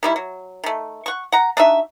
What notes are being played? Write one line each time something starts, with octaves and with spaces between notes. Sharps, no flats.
D#3 G3 E4
F#3
D#3 A3
F#5 C#6
F#5 A#5
D4 D#4 F#4 E5